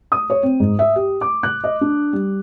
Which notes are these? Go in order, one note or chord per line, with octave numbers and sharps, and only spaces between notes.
D#6
C#5
C4
G#2
E5
G4
D6
F#6
D#5
D4
G3